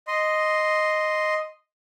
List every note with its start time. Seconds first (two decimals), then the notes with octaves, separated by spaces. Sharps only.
0.08 D#5 C6